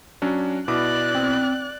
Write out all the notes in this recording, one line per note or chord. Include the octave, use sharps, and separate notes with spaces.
F#3 C#4 D4
B2 E4 D5 D6 F#6
C4